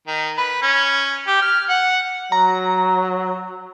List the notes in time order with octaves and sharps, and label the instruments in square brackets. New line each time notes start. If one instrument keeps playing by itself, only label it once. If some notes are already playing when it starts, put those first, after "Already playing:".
[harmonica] D#3
B4
C#4
G4
F6
F#5
[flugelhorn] F#3 [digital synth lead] A#5